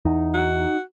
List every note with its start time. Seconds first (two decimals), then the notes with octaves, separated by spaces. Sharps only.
0.05 E2 D#4
0.34 F#4